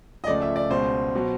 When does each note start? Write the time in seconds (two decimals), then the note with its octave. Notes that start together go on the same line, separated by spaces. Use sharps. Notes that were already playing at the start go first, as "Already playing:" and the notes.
0.24 D#5
0.27 C#2 C#3 F3 A3 D5
0.42 E5
0.56 D5
0.70 C#2 B2 G#3 C5
1.15 B2 F#3